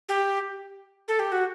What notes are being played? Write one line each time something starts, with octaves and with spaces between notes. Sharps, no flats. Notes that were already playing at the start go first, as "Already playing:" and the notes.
G4
A4
G4
F#4